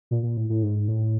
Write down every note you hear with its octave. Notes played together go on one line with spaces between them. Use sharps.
A#2
A#2
A2
A2
G#2
A2